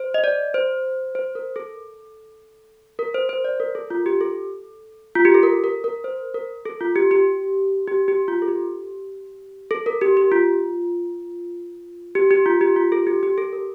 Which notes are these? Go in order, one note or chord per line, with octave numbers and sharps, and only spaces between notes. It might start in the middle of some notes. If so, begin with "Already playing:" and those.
Already playing: C5
D#5
D5
C5
C5
A#4
A4
A#4
C5
C5
D5
A#4
A4
F4
G4
A4
F4
G4
A4
A#4
A#4
A#4
C5
A#4
A4
F4
G4
G4
G4
G4
F4
A4
G4
A4
A#4
G4
G4
F4
G4
G4
F4
G4
F4
A4
G4
G4
A4
A#4